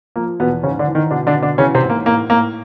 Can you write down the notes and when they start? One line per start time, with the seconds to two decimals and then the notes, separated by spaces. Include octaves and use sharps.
0.16 F3 A#3
0.40 E2 B2 B3
0.63 G#2 C#3 C#4
0.79 D3 D4
0.87 E3
0.95 D#3 D#4
1.11 B2 D3 D4
1.27 D3 D4
1.35 B2
1.42 D3 D4
1.58 C#3 E3 C#4
1.75 C3 C4
1.83 G#2
1.90 A#3
2.05 A2 A#3
2.29 A2 A#3